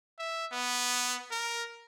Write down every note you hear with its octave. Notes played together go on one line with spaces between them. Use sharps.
E5
B3
A#4